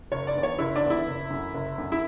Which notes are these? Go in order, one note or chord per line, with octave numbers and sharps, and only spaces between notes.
F#1 C#5
D5
E2 D3
C#5
F#1 E4
D4
E2 D3
E4
F#1
F#2 D3
F#1
F#2 D3
E4